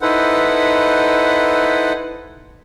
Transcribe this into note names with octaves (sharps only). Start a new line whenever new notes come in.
D#4 E4 A4 B4 C5 F#5